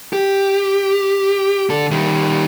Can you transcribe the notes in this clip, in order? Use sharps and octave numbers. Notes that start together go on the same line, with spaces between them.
G4
D3 A4
D#3 G3